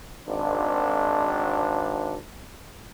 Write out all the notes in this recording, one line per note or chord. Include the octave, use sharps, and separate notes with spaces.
G#1 D4